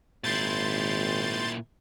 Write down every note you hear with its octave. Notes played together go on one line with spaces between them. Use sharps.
G#1 A#2 E4 C6 G6 A6